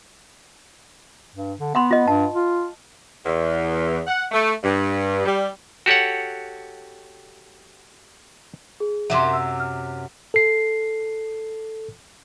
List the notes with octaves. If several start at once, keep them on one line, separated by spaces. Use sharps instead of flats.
G2
D3
B3 F#5 B5 C6
F4 D#5
G2 A5
F4
E2
F#5
A3
G2
G3
F#4 G4 A4 C#5 F#5
G#4
F#2 C3 F#3 E5 C6
E6
F6
A4 C7